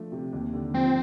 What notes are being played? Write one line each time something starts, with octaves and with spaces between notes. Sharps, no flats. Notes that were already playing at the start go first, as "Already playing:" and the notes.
Already playing: F3 A3 D4
C3
D#2
D3
F3 C4